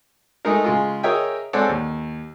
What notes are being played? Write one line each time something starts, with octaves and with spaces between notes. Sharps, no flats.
G#3 A3 D#4 G#4 A#4
C#3 G#3 F4
G#4 A#4 C#5 D#5 E5 G5
G#3 C4 A4 C#5 D5 F#5
D#2